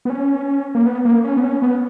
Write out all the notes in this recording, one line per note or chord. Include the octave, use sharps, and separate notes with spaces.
B3
C#4
A#3
B3
A#3
C#4
B3
C#4
B3